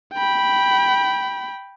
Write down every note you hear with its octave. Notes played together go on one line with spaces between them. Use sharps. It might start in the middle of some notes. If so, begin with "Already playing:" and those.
G5 B5